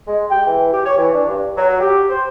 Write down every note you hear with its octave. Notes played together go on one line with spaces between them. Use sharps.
G#3
G5
E3
G4
C#5
E3
D4
G2
F#3
G4
C5